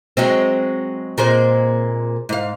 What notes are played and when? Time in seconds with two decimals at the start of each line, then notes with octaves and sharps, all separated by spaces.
0.17 F#3 G#3 C4
1.18 A#2 G#3 C4
2.29 G#2 F5